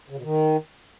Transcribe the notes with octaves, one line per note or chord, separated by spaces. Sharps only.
C#3
B2
D#3